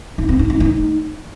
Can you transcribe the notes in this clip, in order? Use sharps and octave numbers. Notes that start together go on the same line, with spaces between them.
D#4
C4
D#4
D#4
D#4